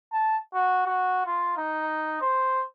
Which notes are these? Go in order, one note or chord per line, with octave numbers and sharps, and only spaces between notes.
A5
F#4
F#4
F4
D#4
C5